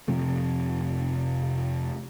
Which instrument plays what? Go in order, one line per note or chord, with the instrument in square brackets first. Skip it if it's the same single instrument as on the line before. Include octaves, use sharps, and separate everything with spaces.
[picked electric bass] F1 C3 F3 A3